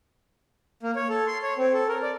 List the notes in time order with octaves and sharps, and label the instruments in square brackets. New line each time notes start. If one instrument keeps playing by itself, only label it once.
[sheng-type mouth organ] A#3
C#5
A4
C6
C#5
C4
A4
A#4
D5